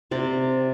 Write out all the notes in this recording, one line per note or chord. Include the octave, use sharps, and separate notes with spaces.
C3 D5